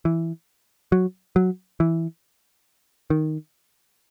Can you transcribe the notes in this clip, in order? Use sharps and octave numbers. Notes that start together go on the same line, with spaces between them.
E3
F#3
F#3
E3
D#3